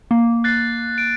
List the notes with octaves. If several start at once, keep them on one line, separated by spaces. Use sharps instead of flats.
A#3
F#6 A6 C7
D7